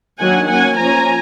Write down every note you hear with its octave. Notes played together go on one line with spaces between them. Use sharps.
D#3 F#3 A#3 D4 F#5 G#5
F#3 A#3 C#4 F#5 G#5
F3 A#3 C#4 G#5 A#5